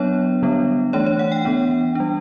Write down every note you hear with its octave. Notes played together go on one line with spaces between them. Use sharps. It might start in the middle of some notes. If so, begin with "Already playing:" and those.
Already playing: F#3 B3 D4 C#5
D3 G3 B3 D4
E3 A3 D4 C#5
C#5
F#5
G5
E3 B3 D4
G3 D4